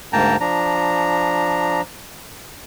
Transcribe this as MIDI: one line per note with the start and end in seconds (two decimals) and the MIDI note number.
0.13 0.36 38
0.13 0.36 44
0.13 0.36 58
0.13 0.36 79
0.13 0.36 81
0.13 0.36 82
0.40 1.81 53
0.40 1.81 62
0.40 1.81 82